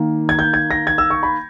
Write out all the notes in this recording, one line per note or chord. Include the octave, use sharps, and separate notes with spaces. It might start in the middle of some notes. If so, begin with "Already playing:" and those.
Already playing: D#3 A#3
G#6
G6
G#6
A#6
G#6
E6
C#6
B5